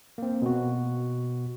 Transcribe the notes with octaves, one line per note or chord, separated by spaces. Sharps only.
A#3 C4
B2 F#4